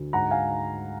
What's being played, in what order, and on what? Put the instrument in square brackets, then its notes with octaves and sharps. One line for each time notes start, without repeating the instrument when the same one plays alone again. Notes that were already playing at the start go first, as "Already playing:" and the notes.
Already playing: [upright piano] D2
G#2 F#5 A#5
F5 G#5